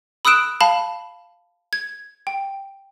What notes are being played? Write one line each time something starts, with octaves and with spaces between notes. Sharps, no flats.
B5 D#6 E6 F#6 D7 E7
F5 A5 B5
G#6
G5